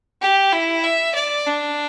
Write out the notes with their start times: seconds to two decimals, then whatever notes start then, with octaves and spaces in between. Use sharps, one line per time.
0.21 G4
0.53 E4
0.84 E5
1.15 D5
1.47 D4